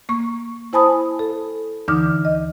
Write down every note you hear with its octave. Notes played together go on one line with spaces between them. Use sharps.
A#3 C#6
E4 C5 G#5 A5 B5 D#6
A4
D2 D3 E3 D#4 D6 F6
D#5